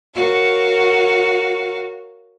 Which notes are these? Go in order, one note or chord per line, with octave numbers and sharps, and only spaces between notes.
F#4 A#4 C#5 F5